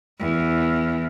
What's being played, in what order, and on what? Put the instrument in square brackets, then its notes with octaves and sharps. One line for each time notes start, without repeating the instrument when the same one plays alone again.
[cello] E2